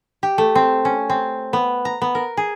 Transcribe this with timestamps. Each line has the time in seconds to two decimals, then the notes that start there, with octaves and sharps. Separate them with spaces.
0.23 G4
0.38 A3
0.55 C4
0.85 C#4
1.10 C4
1.53 B3
1.85 A#5
2.02 B3
2.15 A#4
2.37 G#4